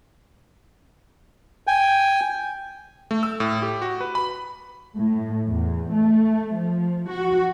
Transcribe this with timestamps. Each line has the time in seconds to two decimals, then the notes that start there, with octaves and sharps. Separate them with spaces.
1.67 G5 G#5
3.11 A3
3.23 E6
3.40 A2
3.62 G4
3.82 F#4
4.01 B4
4.15 B5
4.96 A2
5.48 E2
5.94 A3
6.56 F3
7.09 F#4